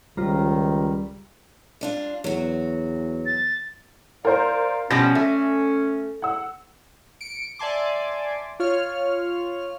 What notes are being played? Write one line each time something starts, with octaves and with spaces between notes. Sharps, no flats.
C#2 D#3 G3 F4 C5 A#5
G3 D4 F4
E2 F#3 F#4
A6
F4 A#4 C5 D5 F5 A#5
B2 F3 G3 C#4 A#6
A3
F#5 E6
C#7 D7
D5 E5 G#5 A5 C6 D6
F4 C#5 F6